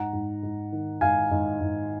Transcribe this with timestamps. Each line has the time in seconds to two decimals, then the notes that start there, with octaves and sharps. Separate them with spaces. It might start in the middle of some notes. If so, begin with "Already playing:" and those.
Already playing: G#2 F#5 A#5
0.13 G#2
0.43 G#2
0.72 D#3
1.01 G#2 F5 G#5
1.31 G#2
1.61 G#2